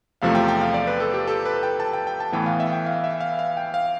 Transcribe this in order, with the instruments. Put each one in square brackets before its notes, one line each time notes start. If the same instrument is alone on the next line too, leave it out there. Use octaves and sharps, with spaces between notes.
[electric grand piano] E2 C3 F3 A3 F5
G5
G5
F5
D5
B4
A4
G4
A4
B4
G5
A5
G5
G5
A5
A2 E3 B3 G5
F5
E5
G5
F5
E5
F5
F5
G5
F5